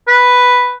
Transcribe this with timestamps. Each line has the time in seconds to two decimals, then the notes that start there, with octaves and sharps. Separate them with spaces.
0.08 B4